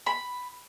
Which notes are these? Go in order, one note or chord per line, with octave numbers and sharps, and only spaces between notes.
B5